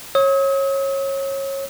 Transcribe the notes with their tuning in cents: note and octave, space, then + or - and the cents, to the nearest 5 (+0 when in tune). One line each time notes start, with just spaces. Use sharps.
C#5 -25 D#6 +45